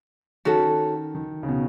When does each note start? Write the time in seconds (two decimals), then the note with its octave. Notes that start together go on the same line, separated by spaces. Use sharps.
0.45 D#3 C#4 F#4 A4
1.15 D#3
1.43 C#3
1.49 B2